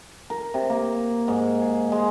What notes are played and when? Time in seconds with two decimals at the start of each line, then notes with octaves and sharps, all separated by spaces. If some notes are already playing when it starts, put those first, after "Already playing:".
0.30 A#4
0.54 C3
0.70 A#3
1.28 G#2
1.62 G#4
1.92 G#3